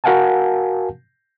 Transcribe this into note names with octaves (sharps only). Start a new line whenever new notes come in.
F#4 A#4 F5 F#5 G#5 A5